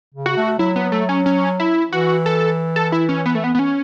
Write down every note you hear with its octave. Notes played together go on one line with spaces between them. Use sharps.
C#3
F#4
A3
F#3 E4
B3
A3
C#4
C#4
E4
E3 F#4
A4
A4
E4
C#4
B3
A3
B3
B3
C#4